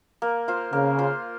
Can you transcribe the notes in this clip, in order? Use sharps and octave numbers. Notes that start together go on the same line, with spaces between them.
A#3
F4 C5
C#3 A#3
F4 C5